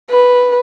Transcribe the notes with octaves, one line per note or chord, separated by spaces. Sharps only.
B4